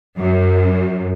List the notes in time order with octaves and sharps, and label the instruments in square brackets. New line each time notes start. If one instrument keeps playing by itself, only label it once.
[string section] F#2